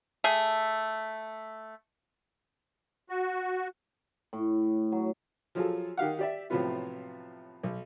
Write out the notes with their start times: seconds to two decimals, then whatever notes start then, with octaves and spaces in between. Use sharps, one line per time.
0.24 A3 G#4
3.09 F#4
4.33 A2
4.92 F#3
5.55 F3 F#3 F4 G#4 A4
5.97 D#3 G4 F5 F#5
6.19 G4 D5 E5
6.50 A2 C3 F3 F#3 B3 F4
7.63 B1